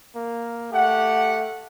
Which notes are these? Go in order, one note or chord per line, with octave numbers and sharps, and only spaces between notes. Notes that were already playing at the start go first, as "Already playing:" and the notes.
A#3
A3 G4 F#5